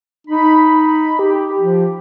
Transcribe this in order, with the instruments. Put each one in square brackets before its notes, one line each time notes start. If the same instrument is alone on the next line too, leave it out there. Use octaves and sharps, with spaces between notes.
[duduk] D#4 [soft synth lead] B5
[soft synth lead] G4
[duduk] F3